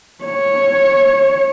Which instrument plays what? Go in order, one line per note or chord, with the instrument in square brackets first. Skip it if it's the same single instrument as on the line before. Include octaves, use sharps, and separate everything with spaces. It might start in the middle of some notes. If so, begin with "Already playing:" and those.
[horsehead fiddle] C#5